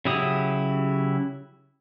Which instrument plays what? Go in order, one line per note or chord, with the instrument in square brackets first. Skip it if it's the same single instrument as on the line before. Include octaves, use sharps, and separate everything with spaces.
[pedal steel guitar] C#3 F#3 E4 G4 D#6